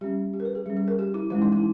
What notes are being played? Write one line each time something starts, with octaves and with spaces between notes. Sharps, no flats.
G3 C#4 G4
G4
A#4
B4
G#4
G3 C#4
G#4
A#4
G4
E4
E3 G#3 C#4 E4
D#4
E4